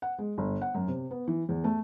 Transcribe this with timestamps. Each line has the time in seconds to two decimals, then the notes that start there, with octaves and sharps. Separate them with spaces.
0.02 F#5
0.19 G#3
0.38 G1
0.61 F#5
0.75 F#2
0.88 C3
1.11 B3
1.27 E3
1.49 E2
1.64 A3